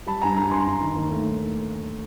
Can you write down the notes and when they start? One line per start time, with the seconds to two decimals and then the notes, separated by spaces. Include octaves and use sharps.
0.07 G3 A5 B5
0.21 G2 G#5 A#5
0.36 G2 G#5 A#5
0.51 G2 A#5 C6
0.66 G2
0.81 D#3
0.96 D#2
1.11 A3